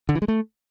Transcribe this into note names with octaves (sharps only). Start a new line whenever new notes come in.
D3
E3
G#3
A3